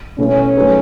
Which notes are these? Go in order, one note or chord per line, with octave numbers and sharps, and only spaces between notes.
B2 A3 C#4 E4 A4
F#3 A3 D#4 G#4 B4